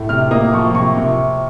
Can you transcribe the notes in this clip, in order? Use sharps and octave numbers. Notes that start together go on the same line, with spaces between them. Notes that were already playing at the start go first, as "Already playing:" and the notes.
Already playing: A2
C3 F6
A#3 D#6
F3 C#6
C3 C#6
C3